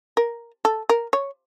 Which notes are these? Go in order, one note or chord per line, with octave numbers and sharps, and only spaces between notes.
A#4
A4
A#4
C#5